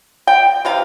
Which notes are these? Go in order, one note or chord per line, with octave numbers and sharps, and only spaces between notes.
G5
C3 E3 F5